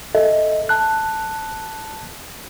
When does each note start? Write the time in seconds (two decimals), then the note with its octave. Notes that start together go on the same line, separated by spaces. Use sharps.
0.15 A4 D#5 E5
0.69 A5 F#6